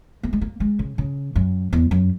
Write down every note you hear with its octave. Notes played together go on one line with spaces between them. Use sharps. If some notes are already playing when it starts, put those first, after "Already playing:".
A#3
G#3
A#3
G#3
C#3
C#3
F#2
E2
F#2